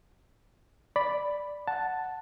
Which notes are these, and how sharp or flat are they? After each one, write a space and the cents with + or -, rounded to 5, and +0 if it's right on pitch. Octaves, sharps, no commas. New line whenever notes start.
D5 +0 B5 +0
F#5 +0 A5 +0